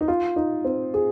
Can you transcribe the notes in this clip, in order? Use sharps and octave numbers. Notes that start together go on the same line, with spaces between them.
D#4
F4
D#4
C4
G#4